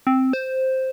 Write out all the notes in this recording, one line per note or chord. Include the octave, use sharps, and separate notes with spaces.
C4
C5